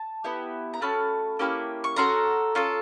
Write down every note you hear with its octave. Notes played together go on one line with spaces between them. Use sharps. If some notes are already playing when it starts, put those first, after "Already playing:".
Already playing: A5
B3 E4 G4
A#5
A3 C#4 F#4 A5 B5
A#3 C#4 E4 G4
C#6
C#4 F#4 A4 A#5 C6
C#4 F4 A4